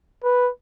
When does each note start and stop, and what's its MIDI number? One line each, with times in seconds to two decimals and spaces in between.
0.24 0.49 71